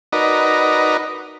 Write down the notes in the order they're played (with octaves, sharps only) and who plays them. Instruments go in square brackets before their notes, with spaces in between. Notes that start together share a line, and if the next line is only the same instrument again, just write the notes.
[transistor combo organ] D#4 F#4 A#4 B4 D5 D#5